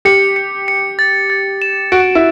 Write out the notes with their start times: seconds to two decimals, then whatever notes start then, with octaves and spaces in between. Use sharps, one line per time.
0.05 G4 C#7
0.36 C#7
0.68 C#7
0.99 A6
1.30 A6
1.62 E7
1.92 F#4 D7
2.15 E4